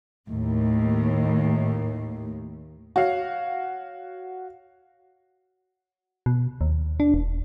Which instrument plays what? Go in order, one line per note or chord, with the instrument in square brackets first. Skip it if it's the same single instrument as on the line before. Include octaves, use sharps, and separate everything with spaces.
[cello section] D#2 A2
[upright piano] F#4 C#5 F5
[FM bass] B2
D#2
D4
E1